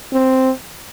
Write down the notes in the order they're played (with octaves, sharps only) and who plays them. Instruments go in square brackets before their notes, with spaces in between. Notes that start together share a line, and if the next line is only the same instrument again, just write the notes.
[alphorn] C4